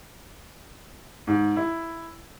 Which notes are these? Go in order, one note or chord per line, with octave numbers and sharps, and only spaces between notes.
G#2
E4